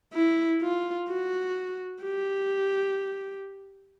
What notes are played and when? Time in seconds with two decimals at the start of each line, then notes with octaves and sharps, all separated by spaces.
0.14 E4
0.62 F4
1.08 F#4
2.03 G4